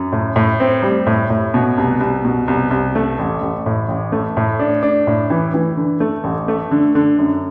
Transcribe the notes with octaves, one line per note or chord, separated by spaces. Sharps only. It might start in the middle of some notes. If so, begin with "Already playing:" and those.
Already playing: F#2
A2
A2
C4
G3
A2
A2
B2
C2
C2
B2
C2
C2
A3
A1
A1
A2
A1
A3
A2
D4
D4
A2
E3
E3
D3
A3
A1
A3
D3
D3
F#2